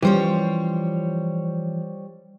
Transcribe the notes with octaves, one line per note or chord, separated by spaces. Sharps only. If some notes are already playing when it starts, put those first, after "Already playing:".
E3 F3 G3 C#4 C5 C#5